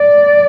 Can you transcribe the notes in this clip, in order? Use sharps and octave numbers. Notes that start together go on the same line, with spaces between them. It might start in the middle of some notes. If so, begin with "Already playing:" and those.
Already playing: D5